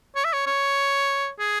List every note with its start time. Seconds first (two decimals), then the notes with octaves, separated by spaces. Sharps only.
0.16 C#5
0.24 E5
0.33 C#5
0.46 C#5
1.39 G#4